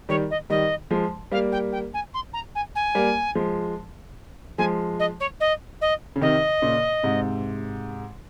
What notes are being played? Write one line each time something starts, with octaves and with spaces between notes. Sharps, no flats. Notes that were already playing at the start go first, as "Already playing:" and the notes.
D#3 G3 C#5
D#5
D#3 G3 D#5
F3 G#3
G3 A#3 F5
G5
G5
G#5
C6
A#5
G#5
G#5
G3 A#3
F3 G#3
F3 G#3 G#5
D#5
C#5
D#5
D#5
C#3
C3 D#3 D#5
A#2 C#3
G#2 C3